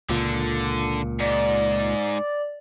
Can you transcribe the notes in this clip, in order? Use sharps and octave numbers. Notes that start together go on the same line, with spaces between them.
C#2 A#2 D3
G#2 D5